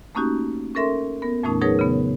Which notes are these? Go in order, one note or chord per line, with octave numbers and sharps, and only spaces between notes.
A3 A#3 C#4 D#4 F#4 G4
C#4 A4 A#4 E5 C6
B3 A#4
F2 A#2 E3 A3 C#4 D#4
F#3 D#4 G#4 A#4 B4 C#5
C#3 B3